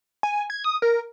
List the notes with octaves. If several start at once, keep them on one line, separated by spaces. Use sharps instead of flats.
G#5
G#6
D#6
A#4